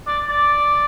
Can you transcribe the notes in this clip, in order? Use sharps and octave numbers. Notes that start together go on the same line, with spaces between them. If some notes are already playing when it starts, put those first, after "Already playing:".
D5
D5